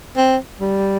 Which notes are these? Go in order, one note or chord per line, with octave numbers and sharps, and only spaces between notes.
C4
G3